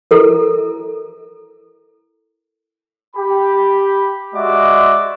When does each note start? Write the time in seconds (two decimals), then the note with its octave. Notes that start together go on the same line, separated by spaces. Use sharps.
0.11 E4 A4 A#4
3.16 G4 B5
4.35 G#3 F#4 D5 E5 D6